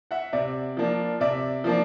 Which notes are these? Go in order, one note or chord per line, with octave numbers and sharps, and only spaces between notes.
E5 F#5
C3 D5 E5
F3 A#3 D4
C3 D5 E5
F3 A#3 D4